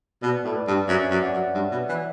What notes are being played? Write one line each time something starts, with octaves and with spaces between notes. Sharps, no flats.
B2 B4 D5
A2
B4 D5
G2
F#2 C#5 E5
F#2
D5 F#5
F#2
G2
B2
E3